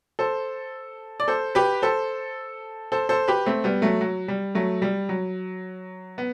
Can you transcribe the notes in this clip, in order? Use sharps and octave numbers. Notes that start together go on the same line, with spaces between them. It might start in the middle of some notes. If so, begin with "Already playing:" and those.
A4 C5
D5
A4 C5
G4 B4
A4 C5
A4 C5
A4 C5
G4 B4
A3 C4
G3 B3
F#3 A3
F#3
G3
F#3 A3
G3
F#3
B3